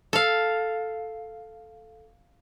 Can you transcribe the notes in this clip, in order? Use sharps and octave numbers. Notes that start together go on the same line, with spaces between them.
A4 F5